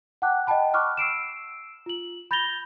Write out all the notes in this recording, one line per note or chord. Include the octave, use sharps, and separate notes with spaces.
F#5 G5 A5 D6 F#6
D#5 F#5 G5 A5 B5
B5 C#6 D6 F6 F#6
E6 C7 D7 E7
F4 F#7
B5 G6 A6 A#6 F7 G7